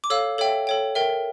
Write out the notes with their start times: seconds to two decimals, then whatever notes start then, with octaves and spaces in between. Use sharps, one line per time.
0.04 D6
0.10 A4 C#5 F5 E6
0.38 A4 C#5 E5 G5
0.67 A4 C#5 G5
0.95 A#4 E5 G5